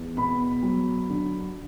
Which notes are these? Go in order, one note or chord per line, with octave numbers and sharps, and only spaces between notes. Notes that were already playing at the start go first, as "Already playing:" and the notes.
Already playing: E2 E3
B2 B5
F#3
D3